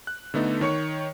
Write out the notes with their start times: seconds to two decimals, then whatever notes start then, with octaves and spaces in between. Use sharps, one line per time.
0.07 F#6
0.34 D3 A3 B3 D#4 A4
0.61 D#3 C#5 C#6 C#7